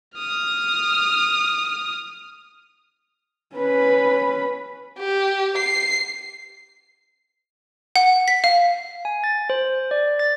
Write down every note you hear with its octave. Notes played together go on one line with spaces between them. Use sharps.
D#6 F6
C#4 B4 B5
G4
C7
F#5
B6
F5
G#5
A6
C5
D5
A6